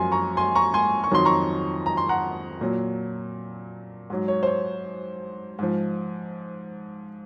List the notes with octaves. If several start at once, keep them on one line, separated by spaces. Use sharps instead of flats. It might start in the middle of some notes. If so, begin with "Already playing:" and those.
Already playing: F#2 F3 G#5 C6
A#5 C#6
G#5 C6
A#5 C#6
G#5 C6
C#6
F2 D#3 F#3 C6
A#5 C#6
A#5
C6
F#5 A#5
A#2 F#3
G#2 F#3
C#5
C5
C#5
G#2 F3